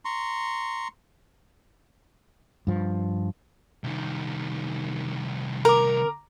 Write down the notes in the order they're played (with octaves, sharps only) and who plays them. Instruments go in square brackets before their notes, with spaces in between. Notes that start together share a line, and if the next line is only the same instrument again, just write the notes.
[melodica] A#5 C6 C#6
[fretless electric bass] G2 F3
[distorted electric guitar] C2 D#3
[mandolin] A#4 [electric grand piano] A#5 D6